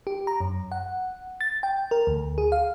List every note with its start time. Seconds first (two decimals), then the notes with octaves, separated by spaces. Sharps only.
0.07 G4
0.27 A#5
0.40 F#2
0.72 F#5
1.41 A6
1.63 G5
1.91 A#4
2.07 D2
2.38 G#4
2.52 F5